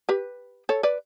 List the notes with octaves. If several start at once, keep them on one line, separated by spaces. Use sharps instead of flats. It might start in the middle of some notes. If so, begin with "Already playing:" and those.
G4 B4
A4 C#5
B4 D5